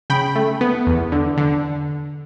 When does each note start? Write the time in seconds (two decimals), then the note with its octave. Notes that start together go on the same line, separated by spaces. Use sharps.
0.10 C#3 G5 B5
0.36 A3
0.61 B3
0.87 E2
1.12 D3
1.37 D3